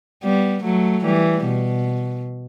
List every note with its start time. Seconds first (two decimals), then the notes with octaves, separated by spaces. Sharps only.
0.23 G3 B3
0.64 F#3 A3
1.05 E3 G3
1.46 B2